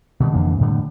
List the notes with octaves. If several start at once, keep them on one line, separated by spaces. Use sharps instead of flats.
B2 D#3 G3
F2 D3 E3 A#3
A2 D3 G3